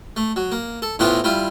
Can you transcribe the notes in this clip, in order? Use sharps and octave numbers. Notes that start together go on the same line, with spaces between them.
A3
F#3
A#3
A4
A2 E3 B3 C4 E4 F4
G3 E4 F4